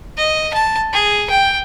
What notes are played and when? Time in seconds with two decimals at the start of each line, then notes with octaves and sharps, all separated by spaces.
0.17 D#5
0.53 A5
0.93 G#4
1.30 G5